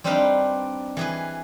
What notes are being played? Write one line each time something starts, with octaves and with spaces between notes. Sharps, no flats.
G3 C4 D4 D#4 B4 F5
E3 G#4 B4